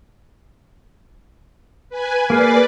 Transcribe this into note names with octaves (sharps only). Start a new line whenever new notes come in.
B4 G#5
A#3 G#4 B4 D5 F5 D6